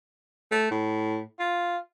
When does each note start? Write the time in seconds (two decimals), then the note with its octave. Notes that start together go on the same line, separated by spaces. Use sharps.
0.52 A3
0.71 A2
1.39 F4